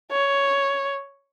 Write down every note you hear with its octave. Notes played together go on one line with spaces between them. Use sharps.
C#5